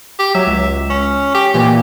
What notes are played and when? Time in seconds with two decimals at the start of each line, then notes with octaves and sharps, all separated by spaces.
0.19 G4
0.35 F#3 E5
0.47 C#2
0.90 C#4
1.35 G4
1.54 A#2 E3 A#3 G4